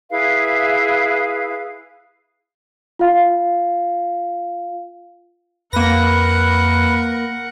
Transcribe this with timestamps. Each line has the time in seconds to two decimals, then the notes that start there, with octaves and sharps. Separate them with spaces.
0.11 E4 G#4 B4 F5
2.99 F4 F5
5.73 F2 A#3 A#4 B4 F#5 A#6